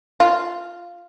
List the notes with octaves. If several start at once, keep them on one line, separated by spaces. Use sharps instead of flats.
F4